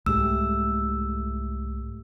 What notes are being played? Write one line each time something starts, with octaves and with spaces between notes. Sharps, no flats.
C2 G#2 G#3 A3 G4 E6